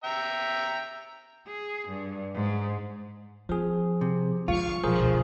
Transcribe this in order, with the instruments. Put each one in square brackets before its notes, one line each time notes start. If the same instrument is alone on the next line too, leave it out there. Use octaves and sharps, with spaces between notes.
[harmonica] E5 G5 A#5
[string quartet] G#4
G2
G#2
[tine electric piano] F3 G#4 [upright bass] C4
[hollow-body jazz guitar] C3
[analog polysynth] G1 F5 C#6 [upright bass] F3 B3 [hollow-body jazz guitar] F4
[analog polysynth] G1 F3 [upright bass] B2 [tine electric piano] G#4 A#4 C5
[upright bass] D2 B2